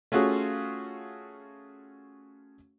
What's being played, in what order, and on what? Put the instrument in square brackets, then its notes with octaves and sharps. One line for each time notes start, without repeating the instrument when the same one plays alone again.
[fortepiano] A3 C#4 F4 F#4 G#4